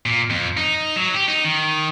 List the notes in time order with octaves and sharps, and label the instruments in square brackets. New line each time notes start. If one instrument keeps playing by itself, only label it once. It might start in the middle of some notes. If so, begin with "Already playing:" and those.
[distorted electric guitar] A#2
F2
D#4
F#3
G4
D#4
D#3